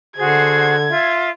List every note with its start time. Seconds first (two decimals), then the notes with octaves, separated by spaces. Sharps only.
0.17 D3 F#4 G#4 C5 G#6
0.89 F4 E5